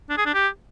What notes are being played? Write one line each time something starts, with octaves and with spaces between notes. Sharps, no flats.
D4
G#4
D4
G4